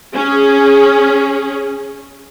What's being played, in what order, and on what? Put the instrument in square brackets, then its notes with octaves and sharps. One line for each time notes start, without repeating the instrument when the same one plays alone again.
[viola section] C#4 G#4